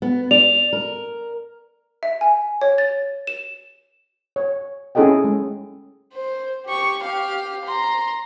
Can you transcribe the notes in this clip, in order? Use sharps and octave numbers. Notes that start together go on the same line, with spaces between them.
B3
D5 F7
A#4
E5
G#5
C#5
A6
E7
C#5
C#4 E4 G#4 A4 D#5 G5
G#3
C5
G4 C#6
G4 F5
A#5 C6